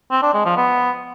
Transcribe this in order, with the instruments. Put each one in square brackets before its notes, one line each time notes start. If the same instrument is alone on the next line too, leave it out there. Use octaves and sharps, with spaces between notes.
[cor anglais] C4
D4
G#3
F3
B3